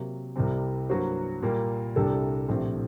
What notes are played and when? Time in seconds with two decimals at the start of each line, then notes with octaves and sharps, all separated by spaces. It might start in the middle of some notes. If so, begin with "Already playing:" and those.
Already playing: C3 F#3 A#3
0.36 C2 C3 G3 C4
0.89 G2 F#3 A#3 F#4 C5
1.42 A#2 G3 A#3
1.96 C2 C3 G3 D4 A4
2.48 A#1 A2 A3 C4 G4